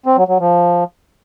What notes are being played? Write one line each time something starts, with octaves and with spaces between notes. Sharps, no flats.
C4
F#3
F#3
F3